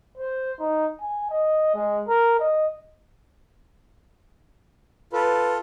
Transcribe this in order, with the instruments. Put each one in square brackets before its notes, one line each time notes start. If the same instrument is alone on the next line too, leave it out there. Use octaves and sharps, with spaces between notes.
[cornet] C5
D#4
G#5
D#5
G#3
A#4
D#5
[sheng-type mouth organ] F4 A4 [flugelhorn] B4